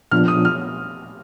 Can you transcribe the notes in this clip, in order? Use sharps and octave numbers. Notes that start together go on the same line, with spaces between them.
A#2 F3 B3 D4 F4 F6
D#6
F6